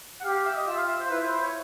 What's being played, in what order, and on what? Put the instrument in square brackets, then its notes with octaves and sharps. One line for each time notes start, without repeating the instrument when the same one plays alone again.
[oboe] F#5
[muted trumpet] G4 [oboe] F5
[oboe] F5
E5
D#5
[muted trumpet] F4 [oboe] E5
[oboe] F5
E5
C5
[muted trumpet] E4 [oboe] B4
[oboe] C5
C5
C#5